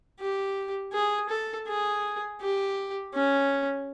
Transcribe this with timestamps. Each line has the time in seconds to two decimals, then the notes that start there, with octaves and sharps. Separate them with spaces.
0.19 G4
0.93 G#4
1.29 A4
1.67 G#4
2.41 G4
3.13 C#4